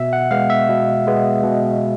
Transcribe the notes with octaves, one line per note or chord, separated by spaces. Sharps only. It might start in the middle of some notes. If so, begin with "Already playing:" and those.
Already playing: B2 E5
F#5
G#3 B3 F5
E5
B2
G#3 B3
B2